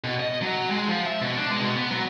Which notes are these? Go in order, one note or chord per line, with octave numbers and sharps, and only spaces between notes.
B2
D#5
F#3
G#3
F3
E5
B2
D4
G#3
B2
B3
F#3